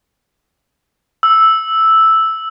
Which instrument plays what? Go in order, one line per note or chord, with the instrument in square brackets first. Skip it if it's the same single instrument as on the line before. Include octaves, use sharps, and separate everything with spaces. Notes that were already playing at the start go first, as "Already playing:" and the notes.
[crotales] E6